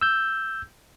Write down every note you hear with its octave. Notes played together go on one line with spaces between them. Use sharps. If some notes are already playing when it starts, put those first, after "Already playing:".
E6 G6